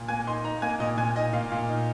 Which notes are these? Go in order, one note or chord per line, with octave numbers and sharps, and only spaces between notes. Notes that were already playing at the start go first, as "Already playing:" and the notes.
Already playing: A#2
A#3 G#5
D#4 C6
D#4 A#5
A#3 G#5
A#2 D#5
A#2 G#5
D#4 D#5
A#2 F5
A#2
D#4